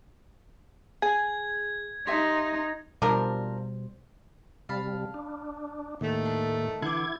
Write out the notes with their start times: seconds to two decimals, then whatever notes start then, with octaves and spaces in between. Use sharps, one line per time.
1.02 G#4 G#5 G#6
2.07 D#4 G4 E5 C6
3.02 B2 F3 G3 D4 A#4 C5
4.69 C3 G3 F5 A5 B5
5.14 D4
6.01 D#2 A2 D#3 A3
6.26 D4
6.82 D3 E3 E4 F#5 D6 G#6